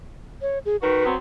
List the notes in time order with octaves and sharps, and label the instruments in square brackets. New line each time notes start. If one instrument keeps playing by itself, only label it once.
[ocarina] C#5
G#4
[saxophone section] D#3 F#4 [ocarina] B4
[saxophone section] F#3 B3 C4